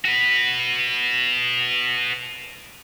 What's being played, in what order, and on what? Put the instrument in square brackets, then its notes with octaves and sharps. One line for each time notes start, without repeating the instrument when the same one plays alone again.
[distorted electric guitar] F#4 B4